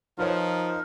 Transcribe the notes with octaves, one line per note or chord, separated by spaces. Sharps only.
F3 D#4 F4 A#4 B4 C#5